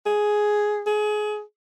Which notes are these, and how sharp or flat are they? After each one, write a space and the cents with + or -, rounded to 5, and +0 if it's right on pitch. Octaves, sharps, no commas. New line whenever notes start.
G#4 +5
G#4 +25